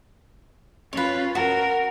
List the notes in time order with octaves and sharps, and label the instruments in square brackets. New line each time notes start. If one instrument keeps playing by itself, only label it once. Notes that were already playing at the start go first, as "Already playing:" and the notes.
[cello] C#4 F4 [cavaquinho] B4 C#5
[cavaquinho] F#4 [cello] A#4